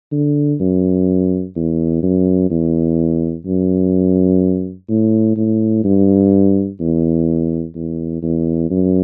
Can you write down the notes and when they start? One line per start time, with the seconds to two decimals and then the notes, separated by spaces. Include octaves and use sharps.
0.12 D3
0.60 F#2
1.56 E2
2.02 F#2
2.50 E2
3.45 F#2
4.89 A2
5.37 A2
5.84 G2
6.80 E2
7.75 E2
8.22 E2
8.70 F#2